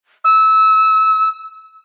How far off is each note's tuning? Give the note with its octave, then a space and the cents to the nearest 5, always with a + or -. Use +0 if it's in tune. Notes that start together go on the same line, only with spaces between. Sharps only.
E6 -20